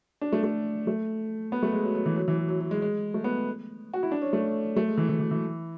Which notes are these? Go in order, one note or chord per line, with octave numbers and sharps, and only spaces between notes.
D4
A3
A3
A3
B3
A3
G#3
F#3
F#3
E3
F#3
E3
F#3
F#3
F#3
G#3
G#3
A3
B3
F#4
E4
D4
C#4
A3
A3
G#3
E3
E3
E3
E3